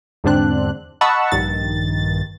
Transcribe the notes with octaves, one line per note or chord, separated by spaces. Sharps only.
E2 G#2 D3 C4 D4 F#6
D#5 F#5 A5 B5 C#6 E6
A#1 G2 D#3 A6